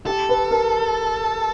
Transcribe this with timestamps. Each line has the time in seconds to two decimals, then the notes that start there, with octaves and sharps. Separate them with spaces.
0.06 G4 A4
0.29 B4
0.51 A#4